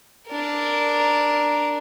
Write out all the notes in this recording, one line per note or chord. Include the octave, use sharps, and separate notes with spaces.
D4 A#4